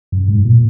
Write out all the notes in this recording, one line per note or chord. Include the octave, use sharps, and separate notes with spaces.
F#2
G#2
A#2